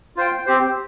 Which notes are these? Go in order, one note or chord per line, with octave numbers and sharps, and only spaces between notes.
F4 C5 G5
C4 G4 C5